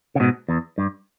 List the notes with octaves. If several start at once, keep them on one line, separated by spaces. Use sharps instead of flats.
C#3
G#2 B2
E2
G2